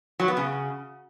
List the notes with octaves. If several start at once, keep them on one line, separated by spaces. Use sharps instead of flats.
F#3
B3
C#3